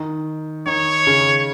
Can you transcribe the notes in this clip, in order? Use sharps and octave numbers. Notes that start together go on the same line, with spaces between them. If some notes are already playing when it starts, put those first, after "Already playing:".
Already playing: D#3
D#3 C#5
C#3